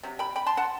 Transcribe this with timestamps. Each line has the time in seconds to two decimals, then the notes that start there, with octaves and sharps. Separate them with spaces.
0.03 C3 F#3
0.19 G5 B5
0.36 G5 B5
0.46 A5 C6
0.57 F#5 A5